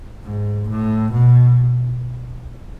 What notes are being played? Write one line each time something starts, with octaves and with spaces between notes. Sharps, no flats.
G#2
A2
B2